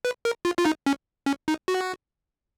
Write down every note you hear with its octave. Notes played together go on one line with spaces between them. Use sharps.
B4
A#4
F4
F4
D#4
C#4
C#4
D#4
F#4